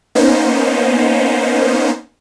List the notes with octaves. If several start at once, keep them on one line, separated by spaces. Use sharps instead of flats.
A#3 B3 C#4 D#4 C5